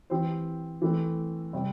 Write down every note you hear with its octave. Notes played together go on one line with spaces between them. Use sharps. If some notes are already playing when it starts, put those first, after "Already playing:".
E3 C4 G4 C5
E3 A3 C4 A4
C3 G3 C4